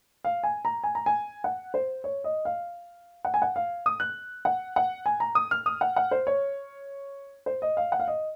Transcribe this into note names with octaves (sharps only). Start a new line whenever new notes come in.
F5
G#5
A#5
G#5
A#5
G#5
F#5
C5
C#5
D#5
F5
F#5
G#5
F#5
F5
D#6
F#6
F#5
F#5
G#5
A#5
D#6
F6
D#6
F#5
F#5
C5
C#5
C5
D#5
F5
F#5
F5
D#5